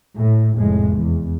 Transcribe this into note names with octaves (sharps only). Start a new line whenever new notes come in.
A2
F1 A2 G#3
E2